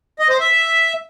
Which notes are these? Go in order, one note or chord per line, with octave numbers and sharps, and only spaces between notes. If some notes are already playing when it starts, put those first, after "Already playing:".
D#5
C5
E5